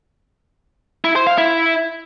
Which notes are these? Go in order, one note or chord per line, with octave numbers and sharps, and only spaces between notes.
E4
C5
F5
E4